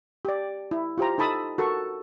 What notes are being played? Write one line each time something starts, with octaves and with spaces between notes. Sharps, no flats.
G4 D5
E4
F4 G4 C5 A#5
D#4 A4 A5 B5 D#6 E6
F#4 A4 A#4 C#6